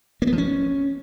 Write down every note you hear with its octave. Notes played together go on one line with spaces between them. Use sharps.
A#3
B3
F3
C#4